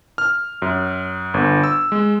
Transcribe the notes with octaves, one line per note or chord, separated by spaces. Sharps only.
F6
F#2
G1
E6
G#3